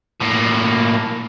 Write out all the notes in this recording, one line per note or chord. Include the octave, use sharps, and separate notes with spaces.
A2 A#3